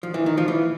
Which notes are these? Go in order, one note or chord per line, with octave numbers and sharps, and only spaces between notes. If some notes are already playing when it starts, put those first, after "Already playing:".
F3
E3
D#3
F3
E3